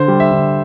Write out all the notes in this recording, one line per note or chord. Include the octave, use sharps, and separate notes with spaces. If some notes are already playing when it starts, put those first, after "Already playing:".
Already playing: D3 C5
G3
E5
D3